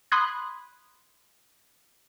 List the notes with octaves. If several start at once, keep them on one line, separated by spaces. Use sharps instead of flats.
B5 C6 D#6 F#6 G#6